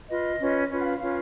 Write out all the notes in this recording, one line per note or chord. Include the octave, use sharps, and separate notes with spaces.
F4 B4 D#5
C#4 F4 B4
C#4 F4 B4
F#5
F5
C#4 F4 B4 F5